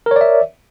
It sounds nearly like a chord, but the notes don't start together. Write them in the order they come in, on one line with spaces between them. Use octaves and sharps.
A#4 C#5 D5 E5